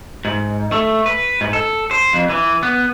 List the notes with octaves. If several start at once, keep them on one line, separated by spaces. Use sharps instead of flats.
G#2
A3
B4
G#2
A4
C5
F2
E3
B3